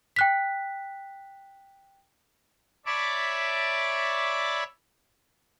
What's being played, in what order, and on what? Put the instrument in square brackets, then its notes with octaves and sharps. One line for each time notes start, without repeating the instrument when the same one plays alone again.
[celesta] G5 F#6 B6
[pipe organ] C#5 D5 E5 A5 B5 D6